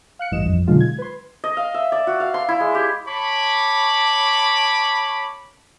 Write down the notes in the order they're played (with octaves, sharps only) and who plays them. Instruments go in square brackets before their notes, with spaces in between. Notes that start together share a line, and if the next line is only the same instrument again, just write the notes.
[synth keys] F5 F#6 C#7
A1 G2 E3 D#5 E7
F2
B2 D3 D#3 F#3 G#3 F4
G#6
B4 C6
[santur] D#5
F5
E5
D5
F#4
F5
C6
E4
G#3
G4
[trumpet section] C#5 A5 B5 C#6 D6